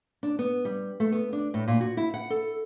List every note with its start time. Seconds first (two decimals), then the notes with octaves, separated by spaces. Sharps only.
0.23 D4
0.39 B3
0.65 G3
1.00 A3
1.12 B3
1.33 D4
1.54 A2
1.68 A#2
1.80 F#4
1.97 E4
2.14 F#5
2.30 A4